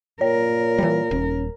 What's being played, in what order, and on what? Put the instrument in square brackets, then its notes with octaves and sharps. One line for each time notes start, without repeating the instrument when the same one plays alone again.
[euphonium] A#2 [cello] A#4 [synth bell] C#5
[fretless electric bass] E3 G3
[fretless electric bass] D#1 [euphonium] C#4